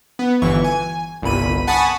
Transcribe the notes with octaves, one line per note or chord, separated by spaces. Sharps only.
B3
G1 E3 C#6
G#5
G1 C2 B5 D#7
F#5 G#5 A5 B5 C#6 D#6